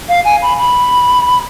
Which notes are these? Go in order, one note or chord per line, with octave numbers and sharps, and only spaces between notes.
F5
G#5
B5
B5